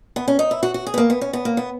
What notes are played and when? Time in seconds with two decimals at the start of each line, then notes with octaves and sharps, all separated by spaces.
0.16 B3
0.28 C#4
0.39 D#4
0.51 E4
0.63 F#4
0.74 F#4
0.87 G#4
0.94 B3
0.98 A#3
1.10 B3
1.21 C#4
1.33 B3
1.45 A#3
1.57 B3